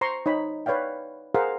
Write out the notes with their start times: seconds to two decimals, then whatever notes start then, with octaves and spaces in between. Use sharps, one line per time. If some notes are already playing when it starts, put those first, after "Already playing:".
0.01 C5 A#5 C6 C#6
0.26 D#4 C#5 B5
0.66 B4 C#5 D5 F5 G5
1.34 G#4 A#4 C5 F5 F#5